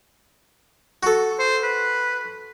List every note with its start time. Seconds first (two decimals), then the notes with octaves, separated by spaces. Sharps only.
1.03 F#4 A4
1.39 C5
1.63 B4